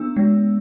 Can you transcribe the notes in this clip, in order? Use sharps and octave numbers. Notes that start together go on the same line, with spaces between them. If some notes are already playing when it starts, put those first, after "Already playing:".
Already playing: B3 D4 E6
G#3